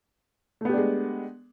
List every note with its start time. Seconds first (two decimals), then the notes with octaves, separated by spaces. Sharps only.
0.61 A3
0.65 B3
0.69 G4
0.74 D4
0.78 G#3